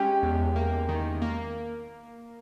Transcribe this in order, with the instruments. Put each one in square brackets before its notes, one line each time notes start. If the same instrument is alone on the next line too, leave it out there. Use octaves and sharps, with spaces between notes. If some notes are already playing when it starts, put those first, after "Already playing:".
Already playing: [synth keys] G#3 C#4 [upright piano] G4
[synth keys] E2
A#3
D#3
A#3